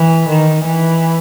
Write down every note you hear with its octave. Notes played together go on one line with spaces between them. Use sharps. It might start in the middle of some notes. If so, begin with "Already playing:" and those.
Already playing: E3
D#3
E3